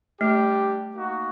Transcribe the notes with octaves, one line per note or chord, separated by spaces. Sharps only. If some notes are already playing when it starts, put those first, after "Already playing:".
G3 A3 D4 G4
A#3 D#4 F#4